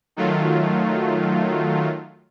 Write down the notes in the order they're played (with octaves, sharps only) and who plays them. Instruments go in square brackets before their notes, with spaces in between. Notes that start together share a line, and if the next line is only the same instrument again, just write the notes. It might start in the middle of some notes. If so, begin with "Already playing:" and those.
[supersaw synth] D#3 F#3 A3 F4